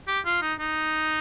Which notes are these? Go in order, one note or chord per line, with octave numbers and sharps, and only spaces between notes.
G4
F4
D#4
D#4